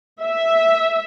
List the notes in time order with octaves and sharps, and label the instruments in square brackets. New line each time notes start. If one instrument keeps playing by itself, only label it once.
[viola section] E5